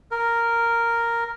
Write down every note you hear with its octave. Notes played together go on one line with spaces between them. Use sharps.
A#4